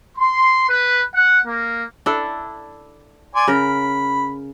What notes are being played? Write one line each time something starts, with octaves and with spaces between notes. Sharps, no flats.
C6
B4
F#5
A#3
D4 E4 A4
D5 G#5 C6
C#3 A#4 B5